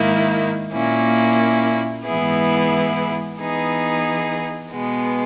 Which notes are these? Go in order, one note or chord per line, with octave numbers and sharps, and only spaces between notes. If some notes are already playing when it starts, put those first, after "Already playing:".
Already playing: G#2 D#3 A#3 E4
A#2 A#3 C#4 E4
G#2 E3 B3 E4 G#4
E3 B3 D#4 G#4
B2 G#3 B3